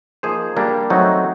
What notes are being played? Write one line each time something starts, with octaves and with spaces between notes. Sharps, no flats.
F3 A#3 D#4 G#4 C5
G3 A#3 D4 G4
F#3 A3 C4 D#4